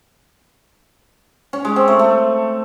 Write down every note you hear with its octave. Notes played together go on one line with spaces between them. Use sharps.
C#4
G#3
C4
A3
A3